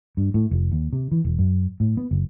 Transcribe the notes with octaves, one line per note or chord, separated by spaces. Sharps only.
G2
A2
F1
D#2
C3
E3
E1
F#2
A2
B3
F#1